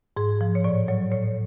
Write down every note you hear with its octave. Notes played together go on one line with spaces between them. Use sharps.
G#2 G#4
F3
C#5
A2 D5
F#3 C#5
A2 C#5